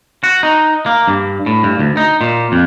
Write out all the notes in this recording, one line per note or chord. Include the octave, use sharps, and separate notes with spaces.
F#4
D#4
A#3
G2
A2
G2
D2
D#4
A#2
F2